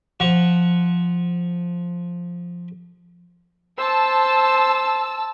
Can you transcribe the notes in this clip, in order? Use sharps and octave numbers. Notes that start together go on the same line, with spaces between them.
F3 F#5 C#6
C5 A5 E6